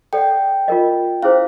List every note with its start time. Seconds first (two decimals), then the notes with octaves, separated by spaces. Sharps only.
0.13 A4 D5 F#5 G5
0.68 F4 A#4 D#5
1.23 C#4 E4 G#4 C5 F5